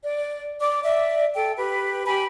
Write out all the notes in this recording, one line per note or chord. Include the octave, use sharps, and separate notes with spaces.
D5
D5 D6
D5 E5
A4 G5
G4 B4
G4 G#5 B5